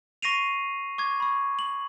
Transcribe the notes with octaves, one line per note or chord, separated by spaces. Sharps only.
C#6 A#6 C7 D#7 F7
C#6 D6 G#6
B5 C#6
F#7